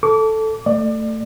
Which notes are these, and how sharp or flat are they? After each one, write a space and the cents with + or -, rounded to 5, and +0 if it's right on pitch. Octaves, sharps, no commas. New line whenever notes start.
A4 +0 D6 -30
A3 +15 D5 +30